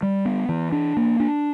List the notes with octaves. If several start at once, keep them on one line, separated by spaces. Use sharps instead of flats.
G3
B3
E3
D4
A#3
D4